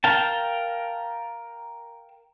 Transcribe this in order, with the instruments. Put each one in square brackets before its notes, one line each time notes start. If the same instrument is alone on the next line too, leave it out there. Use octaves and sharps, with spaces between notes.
[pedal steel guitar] A#4 F5 G5 A5